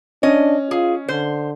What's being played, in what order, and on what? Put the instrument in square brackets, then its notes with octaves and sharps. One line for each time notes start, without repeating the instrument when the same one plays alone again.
[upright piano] C#4 [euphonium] D4 [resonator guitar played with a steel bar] D#5
[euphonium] F4 [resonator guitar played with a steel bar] G#4
[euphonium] D3 [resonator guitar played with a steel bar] C5